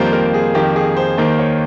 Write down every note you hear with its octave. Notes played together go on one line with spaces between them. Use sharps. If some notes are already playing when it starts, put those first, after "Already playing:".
Already playing: F2 D#3 G3 A#3 F4 C5
A#4
G#4
F2 D#3 A#3 G4
G#4
C5
D#2 D#3 A#3 C5
C#5